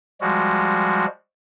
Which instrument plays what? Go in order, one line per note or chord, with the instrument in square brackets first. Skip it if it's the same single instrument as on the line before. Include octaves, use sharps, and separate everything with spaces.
[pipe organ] F3 G3 G#3 F#4